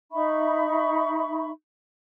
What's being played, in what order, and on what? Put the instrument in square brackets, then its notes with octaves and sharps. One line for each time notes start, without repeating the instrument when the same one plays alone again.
[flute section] D#4 E5 B5 C#6